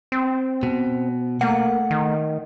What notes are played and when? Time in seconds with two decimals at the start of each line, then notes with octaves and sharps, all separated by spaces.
0.12 C4
0.63 B2
1.41 A3 A#3 F#5
1.91 D#3